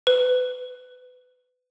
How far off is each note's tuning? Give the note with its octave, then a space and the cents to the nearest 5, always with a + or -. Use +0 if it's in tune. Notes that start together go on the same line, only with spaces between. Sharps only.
B4 +25